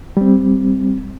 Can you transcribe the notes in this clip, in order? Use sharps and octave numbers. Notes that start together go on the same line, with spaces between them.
G3 C4